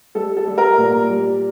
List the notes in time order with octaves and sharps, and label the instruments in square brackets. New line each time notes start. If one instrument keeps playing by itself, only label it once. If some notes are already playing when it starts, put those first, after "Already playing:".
[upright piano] G3 A4
A4
G3
A#4
A#2
G3